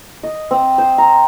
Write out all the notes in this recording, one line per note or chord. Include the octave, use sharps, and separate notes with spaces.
D#5
C4
C5
A#5